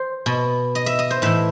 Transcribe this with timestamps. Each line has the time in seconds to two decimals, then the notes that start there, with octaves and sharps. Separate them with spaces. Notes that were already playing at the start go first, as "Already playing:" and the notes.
Already playing: C5
0.26 B2
0.75 D#5
0.86 E5
0.99 D#5
1.11 C5
1.22 A2 E3 E5